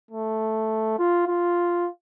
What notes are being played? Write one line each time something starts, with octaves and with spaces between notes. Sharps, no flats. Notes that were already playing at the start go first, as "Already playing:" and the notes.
A3
F4
F4